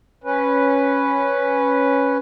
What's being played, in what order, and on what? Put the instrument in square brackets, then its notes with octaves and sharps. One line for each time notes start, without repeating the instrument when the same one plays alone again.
[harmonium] C#4 B4